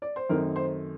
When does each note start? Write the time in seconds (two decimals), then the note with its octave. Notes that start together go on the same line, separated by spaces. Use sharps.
0.02 D5
0.16 C5
0.29 F#2 D#3 A3 C4 D#4 A#4
0.56 C5